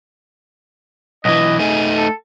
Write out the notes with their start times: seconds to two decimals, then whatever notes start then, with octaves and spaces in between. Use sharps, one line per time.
1.25 B1 E3 D#5
1.59 A3 D#4 G#4
1.95 A4